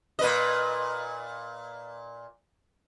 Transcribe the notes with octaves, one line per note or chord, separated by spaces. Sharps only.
A#2 B4 D#5